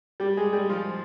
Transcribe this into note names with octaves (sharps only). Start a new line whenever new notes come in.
G3 G4
G#3 G#4
G3 G4
F3 F4